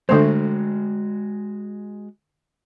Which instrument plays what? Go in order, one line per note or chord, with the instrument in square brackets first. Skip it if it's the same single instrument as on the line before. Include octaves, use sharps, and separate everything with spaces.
[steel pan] D3 A3 C5 [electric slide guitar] G#3 F#4